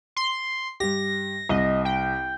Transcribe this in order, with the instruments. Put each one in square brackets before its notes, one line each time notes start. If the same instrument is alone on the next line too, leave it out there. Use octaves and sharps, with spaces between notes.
[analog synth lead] C6
[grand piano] G2 G4 [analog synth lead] A#6
[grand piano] C2 [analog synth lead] D#5
[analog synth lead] G5